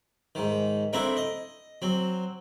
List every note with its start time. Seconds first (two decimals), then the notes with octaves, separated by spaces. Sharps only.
0.35 G#2 D#3
0.93 A3 C4 D4 E4 A#4
1.17 D#5
1.82 F#3 C4